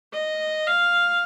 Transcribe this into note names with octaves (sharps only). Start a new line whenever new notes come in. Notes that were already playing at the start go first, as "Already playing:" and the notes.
D#5
F5